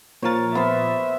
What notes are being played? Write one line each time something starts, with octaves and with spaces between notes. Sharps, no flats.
A#2 F3 A#4 C#5 A6
B3 C5 E5